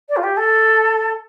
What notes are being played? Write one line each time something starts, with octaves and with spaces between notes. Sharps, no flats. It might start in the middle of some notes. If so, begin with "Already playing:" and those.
D5
F4
G4
A4